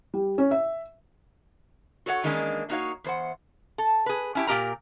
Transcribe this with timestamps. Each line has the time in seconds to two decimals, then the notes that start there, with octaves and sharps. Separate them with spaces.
0.14 G3
0.38 C#4
0.51 E5
2.06 F#4 A4 C#5 D#5 F#5
2.23 D#3 E3 G#3 A#3 C#4 D4
2.69 A3 A#3 D#4 F#4 C#5 F5
3.04 E2 C5 F#5
3.78 A4
4.06 G#4 B4
4.35 C#4 E4 G4
4.47 A#2 G4 A#4 A#5